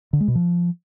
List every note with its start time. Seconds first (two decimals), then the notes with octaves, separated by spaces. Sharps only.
0.13 D3
0.20 G#3
0.28 B2
0.35 F3